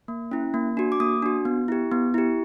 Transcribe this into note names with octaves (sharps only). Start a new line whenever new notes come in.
A#3
C#4 E4
A#3
D4 F#4
D6
A#3 D#6
D4 F#4
B3
E4 G4
B3
E4 G4